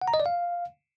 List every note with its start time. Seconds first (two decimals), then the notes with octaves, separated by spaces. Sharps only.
0.02 F#5
0.08 A#5
0.14 D#5
0.20 D5
0.26 F5